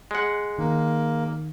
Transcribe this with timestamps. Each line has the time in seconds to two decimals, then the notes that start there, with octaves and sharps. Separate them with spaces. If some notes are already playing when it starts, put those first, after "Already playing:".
0.11 G#3 F#5
0.58 D#3 A#3